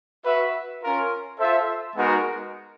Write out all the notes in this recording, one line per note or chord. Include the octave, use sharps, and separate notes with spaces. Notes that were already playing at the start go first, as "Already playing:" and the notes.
F#4 B4 E5
C#4 F4 A#4
F4 A4 C5 E5
G#3 B3 D#4 F#4 A#4